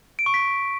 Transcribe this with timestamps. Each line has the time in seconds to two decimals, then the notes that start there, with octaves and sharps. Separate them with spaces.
0.19 D7
0.26 C#6
0.34 B6